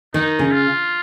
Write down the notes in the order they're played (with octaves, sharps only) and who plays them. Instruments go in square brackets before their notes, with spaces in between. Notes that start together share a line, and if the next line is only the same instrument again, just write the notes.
[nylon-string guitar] D#3 [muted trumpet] D#4
[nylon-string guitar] C#3
[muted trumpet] F4